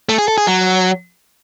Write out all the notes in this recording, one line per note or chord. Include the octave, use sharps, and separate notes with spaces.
A3
G#4
A4
G#4
F#3